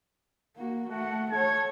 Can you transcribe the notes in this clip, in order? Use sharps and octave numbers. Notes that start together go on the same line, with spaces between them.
A#3 F#4
A3 F#4 F#5
A4 C#5 G#6